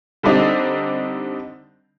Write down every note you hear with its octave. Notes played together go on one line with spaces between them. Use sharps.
D3 G3 C4 D4 D#4